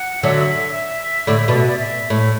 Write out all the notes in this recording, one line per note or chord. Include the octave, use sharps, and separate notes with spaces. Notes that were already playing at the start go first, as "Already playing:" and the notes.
Already playing: F#5
D3 F#3 E5
A2 D3
B2 D5
E5
D5
E5
A2